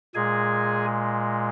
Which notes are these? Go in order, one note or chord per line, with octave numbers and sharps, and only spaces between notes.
A#2 G#3 G#4 G#5